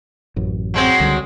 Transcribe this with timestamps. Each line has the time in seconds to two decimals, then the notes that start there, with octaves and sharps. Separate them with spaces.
0.36 A1 F#2
0.74 F#3 G#3 C4
1.00 C#2 D3 G3